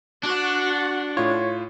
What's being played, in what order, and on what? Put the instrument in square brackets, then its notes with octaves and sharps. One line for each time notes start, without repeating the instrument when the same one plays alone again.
[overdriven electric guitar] D4 [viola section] F#4 F#5
[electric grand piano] A2 F4 [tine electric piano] C#5